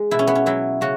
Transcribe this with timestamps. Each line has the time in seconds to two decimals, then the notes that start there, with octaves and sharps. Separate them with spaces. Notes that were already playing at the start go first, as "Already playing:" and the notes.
Already playing: G#3
0.11 B2 E4
0.19 C#4
0.27 B3
0.35 C#4
0.46 F#3 B3 E4
0.81 C#3 C#4 F#4